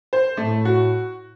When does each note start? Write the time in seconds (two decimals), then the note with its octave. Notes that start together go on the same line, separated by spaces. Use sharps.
0.13 C5
0.37 A2 A3
0.65 F#4